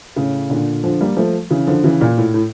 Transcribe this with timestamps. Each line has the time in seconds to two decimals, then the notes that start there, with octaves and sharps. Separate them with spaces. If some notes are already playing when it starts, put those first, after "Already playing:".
0.16 A2 C#3
0.50 A#2 D3
0.83 D3 F3
1.01 G3 A#3
1.17 F3 A3
1.50 C#3 E3
1.67 D3 F3
1.84 C#3 E3
2.01 A#2
2.18 A2
2.34 A2